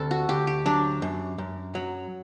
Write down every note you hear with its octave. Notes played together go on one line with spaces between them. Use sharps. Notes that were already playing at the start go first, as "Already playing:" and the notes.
Already playing: D2 C3 A4
F#4
D2 G4
G4
F#3 D4
F#2
F#2
F#3